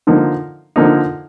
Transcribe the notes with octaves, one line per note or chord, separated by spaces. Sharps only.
D3 F3 A#3 D#4
D3 F3 A#3 D#4